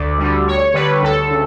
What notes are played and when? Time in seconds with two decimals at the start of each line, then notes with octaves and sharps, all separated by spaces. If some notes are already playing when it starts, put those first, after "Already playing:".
Already playing: D2 D5
0.18 D3 G3
0.46 D2 C#5
0.74 D3 G3 B4
1.03 D2 A4
1.30 C#3